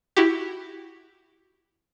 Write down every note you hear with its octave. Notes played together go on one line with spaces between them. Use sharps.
E4 F#4 G4